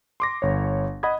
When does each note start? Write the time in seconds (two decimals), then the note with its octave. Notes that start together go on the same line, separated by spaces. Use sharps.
0.20 C6 D6 A#6
0.42 G1 C#5
1.03 D#5 F#5 B5 D#6 G#6